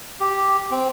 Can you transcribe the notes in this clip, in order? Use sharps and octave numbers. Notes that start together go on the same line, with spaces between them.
G4
C4